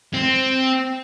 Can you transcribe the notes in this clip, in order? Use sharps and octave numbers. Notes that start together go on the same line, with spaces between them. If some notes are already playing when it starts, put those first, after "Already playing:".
C4